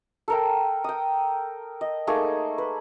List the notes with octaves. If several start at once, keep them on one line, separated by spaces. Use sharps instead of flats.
A4 A#4 G5
G5 D#6
D#5
A3 A#3 D#4 G#4
B4